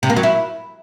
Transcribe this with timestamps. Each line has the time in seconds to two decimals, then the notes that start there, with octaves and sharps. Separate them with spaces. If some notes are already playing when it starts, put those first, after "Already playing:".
0.03 C3
0.10 A#3
0.16 F#3
0.23 E4